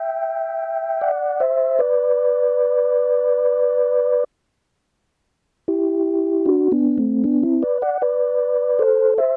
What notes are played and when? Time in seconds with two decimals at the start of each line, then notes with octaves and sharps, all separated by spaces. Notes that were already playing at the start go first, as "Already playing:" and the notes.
Already playing: E5 G5
1.01 D5 F#5
1.40 C5 E5
1.79 B4 D5
5.68 E4 G4
6.46 D4 F#4
6.72 B3 D4
6.98 A3 C4
7.24 B3 D4
7.43 C4 E4
7.63 B4 D5
7.82 D5 F#5
8.02 B4 D5
8.79 A4 C5
9.18 C5 E5